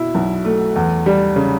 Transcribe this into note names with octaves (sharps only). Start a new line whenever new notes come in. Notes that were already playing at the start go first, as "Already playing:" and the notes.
Already playing: B2 E4
B1
A3
E2
G3
C#3